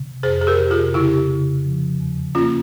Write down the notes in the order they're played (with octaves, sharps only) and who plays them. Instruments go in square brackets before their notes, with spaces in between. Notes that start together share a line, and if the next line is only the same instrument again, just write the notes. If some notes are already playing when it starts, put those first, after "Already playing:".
Already playing: [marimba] C3
[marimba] F2 [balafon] G#4 C5
[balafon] G#4
G4 A#4
[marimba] C3
[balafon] F4 G#4
[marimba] C#3 [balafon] E4 G4
[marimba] C#3
F3
E2
[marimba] A#3 [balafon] C#4 F4